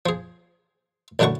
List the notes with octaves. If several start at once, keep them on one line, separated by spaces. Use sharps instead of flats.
F3 G#4
A1 F#2 D3 A3 F#4 C#6